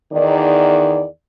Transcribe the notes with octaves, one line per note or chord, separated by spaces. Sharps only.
E2 D#3 D5